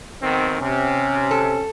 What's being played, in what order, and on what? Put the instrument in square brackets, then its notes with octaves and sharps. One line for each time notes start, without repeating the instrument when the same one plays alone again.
[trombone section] B1 D#3 C4
[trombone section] C3 [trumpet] C#4
[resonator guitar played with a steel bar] A4